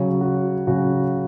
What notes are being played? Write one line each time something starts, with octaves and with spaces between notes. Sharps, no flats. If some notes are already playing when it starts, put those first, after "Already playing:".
Already playing: C#3 F#3 C#5
F#4
C#3 F#3 F#4